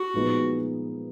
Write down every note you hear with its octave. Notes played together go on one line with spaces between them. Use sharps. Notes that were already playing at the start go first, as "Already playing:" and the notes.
Already playing: F#4
A#2 F3 G#3 B3 D#4